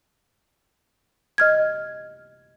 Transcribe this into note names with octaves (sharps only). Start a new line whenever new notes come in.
D#5 F6 G#6